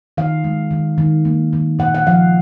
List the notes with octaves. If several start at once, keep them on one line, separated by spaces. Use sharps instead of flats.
D#3 F5
G#3
D#3
D#3
A#3
D#3
A#2 F#5
F#5
F3 F5